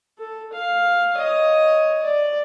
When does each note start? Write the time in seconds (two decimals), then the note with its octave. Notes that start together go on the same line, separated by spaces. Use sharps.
0.19 A4
0.53 F5
1.16 C#5 D#5
2.03 D5